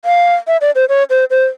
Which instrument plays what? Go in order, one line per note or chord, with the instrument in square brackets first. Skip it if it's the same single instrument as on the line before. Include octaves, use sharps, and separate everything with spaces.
[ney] F5
E5
D5
C5
C#5
C5
C5